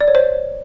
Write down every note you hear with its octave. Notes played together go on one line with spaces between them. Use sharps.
D5
C#5
C5